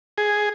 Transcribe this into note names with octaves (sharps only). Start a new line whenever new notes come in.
G#4